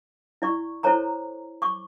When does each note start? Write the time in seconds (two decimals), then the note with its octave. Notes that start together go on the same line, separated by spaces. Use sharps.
0.42 E4 D5 C#6
0.83 E4 A4 C5 C#5 A#5 B5
1.62 C#6 D6